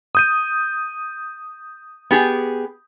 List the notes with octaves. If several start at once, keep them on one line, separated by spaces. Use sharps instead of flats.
D#6 G6 D#7
B3 G4 G#4